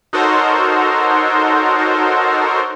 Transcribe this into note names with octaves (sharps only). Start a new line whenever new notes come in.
D#4 F#4 A4 A#4 C5 C#5